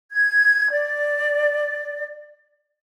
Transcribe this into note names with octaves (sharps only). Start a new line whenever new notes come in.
G#6
D5